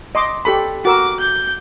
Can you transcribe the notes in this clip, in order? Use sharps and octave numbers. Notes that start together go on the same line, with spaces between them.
D#5 C6 D6
G4 A4 B5
F#4 A#4 D6 E6
G6